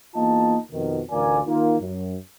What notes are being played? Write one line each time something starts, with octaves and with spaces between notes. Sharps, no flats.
E2 A#3 D#4 F4 A5
F2 B2 D#3
A1 D2 F4 A#4 D5 G#5
D#3 A#3 F4
F#2